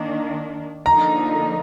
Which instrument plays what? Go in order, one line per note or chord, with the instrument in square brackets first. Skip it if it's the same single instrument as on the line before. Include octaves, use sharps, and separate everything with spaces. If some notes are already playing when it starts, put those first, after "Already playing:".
Already playing: [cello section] D#3 A#3 D4
[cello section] D3 F3 A#3 D#4 [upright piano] A#5